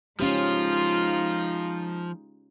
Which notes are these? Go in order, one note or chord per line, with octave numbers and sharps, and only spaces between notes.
F3 G#3 C#4 D#4 F4 G4